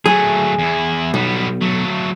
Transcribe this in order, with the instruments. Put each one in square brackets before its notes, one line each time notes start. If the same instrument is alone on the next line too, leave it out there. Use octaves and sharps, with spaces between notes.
[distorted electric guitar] F#3 A3 [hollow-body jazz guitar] G#4
[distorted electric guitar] E2 E4
[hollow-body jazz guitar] B1 [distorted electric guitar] G3 B3
[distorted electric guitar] F#3 A3